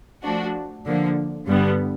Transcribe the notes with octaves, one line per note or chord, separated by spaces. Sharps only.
F3 A3 D4 F#4
D3 F3 A#3
G2 D3 G3 B3